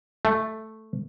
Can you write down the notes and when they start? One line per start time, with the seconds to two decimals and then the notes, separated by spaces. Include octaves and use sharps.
0.25 A3